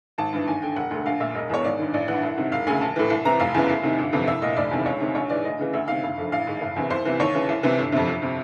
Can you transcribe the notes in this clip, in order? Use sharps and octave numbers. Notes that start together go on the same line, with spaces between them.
G#1 A5
G2 E3
D#2 G#5
D3 G5
E1 F#5
D2 D3
A#1 F5
A#2 E5
E1 D#5
E2 B2 C#5
G#1 D5
G2 D#3
A1 D5
G2 E3 F#5
C2
C3 D#3
E1 F5
D2 C#3 G#5
A#1 A5
A2 E3
C2
C3 E3 A#5
F1 F5
E2 C#3 E3
C2
C3 D#3
G1
F2 C3 E3
C2 E5
A#2 D#5
F1 D5
E2 C3 D#3
C#2 C#5
C3 D#3
A#1 C#5
G#2 E3 D5
D2 D#5
C#3 E3
D2 E5
C3 D#3 F5
F#1 F5
F2 D3
A1 F5
G#2 D#3
F#1
E2 C3 E3
C2 C5
C3 E3
D#2 C#5
C#3 E3
C2
C3 E3
G1
F2 C3
G1
C3